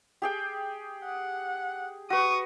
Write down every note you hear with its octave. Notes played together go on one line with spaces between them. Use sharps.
G4 G#4 G5
F#5
F#4 B4 C#6 D#6